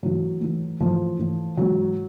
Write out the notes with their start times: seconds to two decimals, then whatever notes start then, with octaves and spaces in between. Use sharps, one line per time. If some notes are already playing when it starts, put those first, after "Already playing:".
0.03 A2 E3 F#3
0.41 A2 E3
0.80 A2 E3 F3
1.19 A2 E3
1.57 G#2 E3 F#3